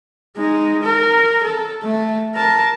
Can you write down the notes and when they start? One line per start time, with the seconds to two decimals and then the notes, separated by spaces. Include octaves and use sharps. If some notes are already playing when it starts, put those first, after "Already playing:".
0.37 G#3 D#4
0.84 A#4
1.44 A4
1.84 A3
2.35 A#4 A5